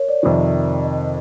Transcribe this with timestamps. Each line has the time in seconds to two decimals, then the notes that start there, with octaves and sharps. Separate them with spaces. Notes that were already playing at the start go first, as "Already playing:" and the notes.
Already playing: A#4 C#5
0.08 D5
0.23 F2 C3 D#3
0.84 D#5